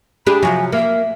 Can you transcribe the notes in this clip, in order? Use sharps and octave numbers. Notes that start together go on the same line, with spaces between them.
D4 G4 G#4 B5
C3 F3 F#3 G#5
A#3 E5